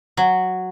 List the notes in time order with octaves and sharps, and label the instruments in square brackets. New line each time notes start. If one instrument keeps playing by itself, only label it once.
[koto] F#3